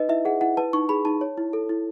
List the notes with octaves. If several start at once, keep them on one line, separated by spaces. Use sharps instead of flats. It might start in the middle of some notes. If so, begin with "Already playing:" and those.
Already playing: D#4 B4 D#5
E4 E5
G#4 F#5
E4 F#5
B4 A5
D#4 C#6
G#4 B5
D#4 A5
C#5
E4
A4
E4